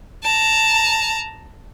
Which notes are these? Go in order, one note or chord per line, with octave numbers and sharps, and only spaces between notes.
A5 A#5